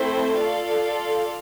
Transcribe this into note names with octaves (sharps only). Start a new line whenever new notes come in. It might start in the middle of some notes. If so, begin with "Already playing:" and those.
Already playing: A3 C4 E4 A4 C5
F4 A4 D5 F5